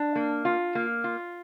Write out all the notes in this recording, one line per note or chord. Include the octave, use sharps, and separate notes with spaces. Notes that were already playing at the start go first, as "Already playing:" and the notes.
Already playing: D4
A#3
F4
A#3
F4